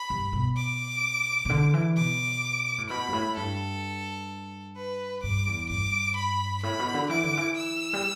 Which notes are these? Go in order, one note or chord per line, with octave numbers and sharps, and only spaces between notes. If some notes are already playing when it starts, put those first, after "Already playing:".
Already playing: B5
G2
B2
D6
B2
D3
E3
B2 D6
A2
B2 B5
G2
A2
G2 A4
B4
G2 D6
E2
G2 D6
B5
A2 B5
B2
D3
E3 D6
D3
E3
E6
G3